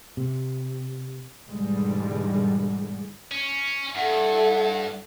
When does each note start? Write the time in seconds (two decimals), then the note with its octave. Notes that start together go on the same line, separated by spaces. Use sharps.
0.17 C3
1.49 E2 G#2 B2 D3 G3 G#3
3.32 C#4
3.95 G2 E4 A4 F#5